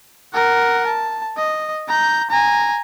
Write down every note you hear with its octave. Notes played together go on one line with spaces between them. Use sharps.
A#4 F#5
A5
D#5
A#5 G6
G#5 A#5